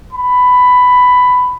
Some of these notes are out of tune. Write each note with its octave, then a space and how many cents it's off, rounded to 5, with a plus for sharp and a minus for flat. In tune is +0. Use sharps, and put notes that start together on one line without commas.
B5 +10